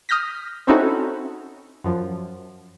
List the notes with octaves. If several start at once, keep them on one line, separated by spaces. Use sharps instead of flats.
D#6 F6 G6 A#6 B6
C4 C#4 D#4 E4 F#4 A4
F#2 F3